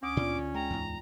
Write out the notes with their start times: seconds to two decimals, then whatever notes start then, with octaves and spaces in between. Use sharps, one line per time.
0.03 D2 C#4 D6 D#6
0.17 A#2 C4 D4 F4 D5
0.38 D3
0.54 G#3 G5 A#5
0.70 E2 G#2